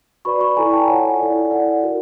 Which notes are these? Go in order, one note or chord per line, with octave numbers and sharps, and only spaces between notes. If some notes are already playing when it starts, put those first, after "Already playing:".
F#4 B4 D5 B5 C#6
B5 C#6
E4 A4 D5 G#5 A#5
G5 A5
F4 A4 C#5 F#5 G#5
E4 A4 D5
E4 A4 D5 F#5
F#4 A#4